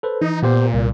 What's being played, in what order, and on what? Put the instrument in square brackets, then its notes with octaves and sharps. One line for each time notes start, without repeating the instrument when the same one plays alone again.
[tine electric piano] A4 B4 C5
[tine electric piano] E3 [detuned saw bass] D#4
[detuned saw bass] A#2 [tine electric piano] B3 G4 C5
[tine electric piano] C2